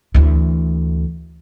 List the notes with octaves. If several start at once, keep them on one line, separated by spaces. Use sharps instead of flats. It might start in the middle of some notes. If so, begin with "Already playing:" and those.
D2 E3